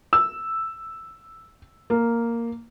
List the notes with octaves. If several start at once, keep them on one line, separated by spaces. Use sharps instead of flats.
E6
A#3